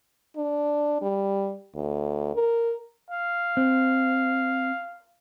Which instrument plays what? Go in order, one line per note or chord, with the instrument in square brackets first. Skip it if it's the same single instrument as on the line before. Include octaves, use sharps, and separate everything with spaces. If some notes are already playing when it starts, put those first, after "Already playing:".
[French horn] D4
G3
D2
A#4
[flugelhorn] F5
[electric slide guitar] C4